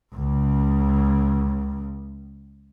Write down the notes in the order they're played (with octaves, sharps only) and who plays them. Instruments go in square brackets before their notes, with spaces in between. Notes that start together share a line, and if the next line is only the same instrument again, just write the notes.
[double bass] C#2 C#3